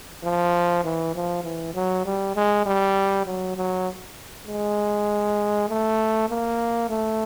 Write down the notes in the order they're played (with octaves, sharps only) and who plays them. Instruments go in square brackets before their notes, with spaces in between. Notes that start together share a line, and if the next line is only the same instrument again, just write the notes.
[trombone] F3
E3
F3
E3
F#3
G3
G#3
G3
F#3
F#3
G#3
A3
A#3
A3